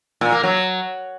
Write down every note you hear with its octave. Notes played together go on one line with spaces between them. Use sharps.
A#2
A#3
F#3